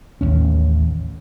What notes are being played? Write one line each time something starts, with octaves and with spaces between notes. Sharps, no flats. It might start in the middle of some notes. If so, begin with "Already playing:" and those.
A1 D#2 G#2 C#4